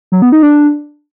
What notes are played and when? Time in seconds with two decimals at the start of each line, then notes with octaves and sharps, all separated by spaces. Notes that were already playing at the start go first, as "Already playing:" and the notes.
0.12 F#3
0.22 B3
0.32 D#4
0.43 D4